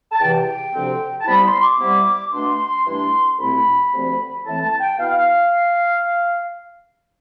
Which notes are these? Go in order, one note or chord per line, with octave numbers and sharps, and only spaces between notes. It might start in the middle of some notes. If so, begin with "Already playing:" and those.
A5
E2 C3 E3 G5
D2 C3 F3 C4
A5
C3 G3 B3 E4 B5
C6
D6
C3 G3 B3 E4
B2 A3 D4 C6
G2 E3 A3 D4
C2 B2 A3 C4 E4 B5
D2 C3 F3 A3 C4
A2 E3 A3 C4 E4 A5
A5
G5
B2 B3 E4 F5